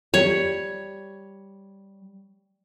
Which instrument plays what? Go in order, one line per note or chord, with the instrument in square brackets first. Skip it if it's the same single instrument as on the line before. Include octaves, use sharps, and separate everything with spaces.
[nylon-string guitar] G3 [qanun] C#5